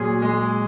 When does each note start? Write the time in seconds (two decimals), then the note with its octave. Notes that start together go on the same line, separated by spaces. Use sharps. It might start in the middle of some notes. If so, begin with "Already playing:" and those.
Already playing: A#2 F#3 G#4
0.22 G#3